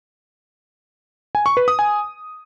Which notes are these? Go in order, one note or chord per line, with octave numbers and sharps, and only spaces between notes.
G#5
C#6
B4
D#6
G#5